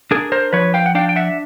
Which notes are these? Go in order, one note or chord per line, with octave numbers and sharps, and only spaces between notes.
D4 G#4 A#4
A#4 C5
F3 B4 C#5
F5 G5
F#5
D4 F5 G5
G5
E5 F#5